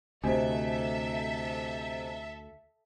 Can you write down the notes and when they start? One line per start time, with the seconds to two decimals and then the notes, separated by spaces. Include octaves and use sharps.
0.24 D2 C3 A4 C5 D#5 E5 G#5